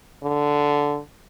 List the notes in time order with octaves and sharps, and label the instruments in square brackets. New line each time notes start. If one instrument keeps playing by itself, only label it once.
[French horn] D3